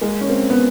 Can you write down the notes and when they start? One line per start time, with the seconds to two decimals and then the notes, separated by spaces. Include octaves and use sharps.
0.01 G#3 A#3
0.21 C#4
0.29 A#3 C4
0.50 B3